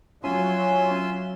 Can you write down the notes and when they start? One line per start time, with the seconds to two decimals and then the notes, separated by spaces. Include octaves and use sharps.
0.24 F#3 C#4 F4 E5 G#5 C6